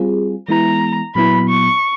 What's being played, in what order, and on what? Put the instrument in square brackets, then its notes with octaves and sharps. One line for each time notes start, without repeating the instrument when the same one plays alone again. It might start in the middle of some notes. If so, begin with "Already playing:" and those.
Already playing: [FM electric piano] G3 C4 F4 G#4
[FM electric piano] E3 G#3 B3 E4 [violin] A#5
[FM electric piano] A#2 F#3 B3 E4 [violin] B5
[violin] C#6